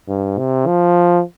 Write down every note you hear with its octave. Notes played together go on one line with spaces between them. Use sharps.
G2
C3
F3